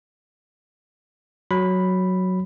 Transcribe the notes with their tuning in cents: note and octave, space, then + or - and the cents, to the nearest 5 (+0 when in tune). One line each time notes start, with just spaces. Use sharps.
F#3 +0 B5 +0